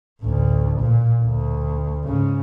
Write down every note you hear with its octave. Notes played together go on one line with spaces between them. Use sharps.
A1 D2
A#2
D2
G#2 C#3